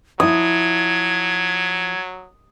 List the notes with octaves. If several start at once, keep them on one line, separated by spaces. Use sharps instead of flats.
F3 F#3 E4 D#6 G#6